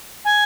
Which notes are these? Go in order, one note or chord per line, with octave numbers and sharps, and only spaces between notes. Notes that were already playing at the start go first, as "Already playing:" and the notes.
G#5